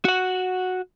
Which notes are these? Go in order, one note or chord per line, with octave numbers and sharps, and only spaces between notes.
F#4 F#5